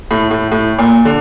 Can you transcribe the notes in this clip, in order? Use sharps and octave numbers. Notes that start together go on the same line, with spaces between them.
A2
A2
A2
A#2
D3